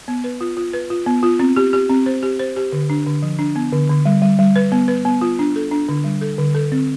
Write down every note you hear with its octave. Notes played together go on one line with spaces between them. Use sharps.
B3
B4
F4
F4
B4
F4
B3
F4
C4
G4
G4
C4
C5
G4
C5
G4
D3
D4
D3
F3
D4
B3
D3
D3
G3
G3
G3
B4
B3
B4
B3
F4
D4
A4
D4
D3
G3
A4
D3
A4
C4